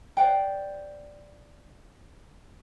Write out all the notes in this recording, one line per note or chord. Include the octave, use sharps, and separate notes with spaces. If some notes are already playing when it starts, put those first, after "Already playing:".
C5 D5 F#5 G5